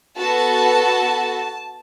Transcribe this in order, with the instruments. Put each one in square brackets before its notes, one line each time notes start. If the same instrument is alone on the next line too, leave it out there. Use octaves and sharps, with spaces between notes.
[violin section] B3 F#4 A4 A5